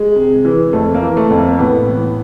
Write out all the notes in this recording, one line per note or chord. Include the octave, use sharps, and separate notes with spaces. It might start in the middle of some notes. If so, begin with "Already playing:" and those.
Already playing: G#3
C3
E3
F2 A3
A#3
E3
A3
F2
A#3
A2 B3
E3